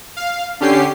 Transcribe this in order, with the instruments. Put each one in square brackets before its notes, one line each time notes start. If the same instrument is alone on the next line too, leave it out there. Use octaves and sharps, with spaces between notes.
[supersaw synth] F5
D3 C#4 G4 C7